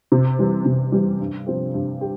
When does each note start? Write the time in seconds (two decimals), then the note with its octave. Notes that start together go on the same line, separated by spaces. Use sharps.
0.12 C3
0.39 E3 G3
0.65 C3
0.92 E3 G3
1.19 G2
1.46 F3 C4 G4
1.74 G2
2.01 G4